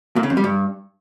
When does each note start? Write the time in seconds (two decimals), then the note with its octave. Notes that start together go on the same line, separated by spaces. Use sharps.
0.16 A#2
0.23 C#3
0.30 F2
0.37 G3
0.44 G2